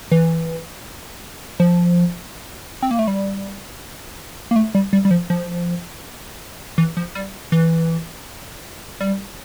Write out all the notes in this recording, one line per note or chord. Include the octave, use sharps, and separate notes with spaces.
E3
F3
C4
A#3
A3
G3
A#3
A3
G3
G3
G3
F3
F3
E3
F3
G3
E3
G3